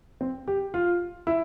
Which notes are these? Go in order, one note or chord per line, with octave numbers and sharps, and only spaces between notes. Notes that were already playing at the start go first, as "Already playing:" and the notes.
C4
G4
F4
E4